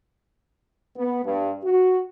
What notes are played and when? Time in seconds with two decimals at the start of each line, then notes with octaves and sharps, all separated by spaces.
0.96 B3
1.25 G2
1.63 F#4